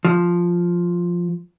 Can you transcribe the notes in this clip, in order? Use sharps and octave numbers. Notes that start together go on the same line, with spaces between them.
F3